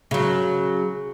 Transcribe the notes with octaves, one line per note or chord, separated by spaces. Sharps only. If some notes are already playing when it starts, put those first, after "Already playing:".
C#3 F#3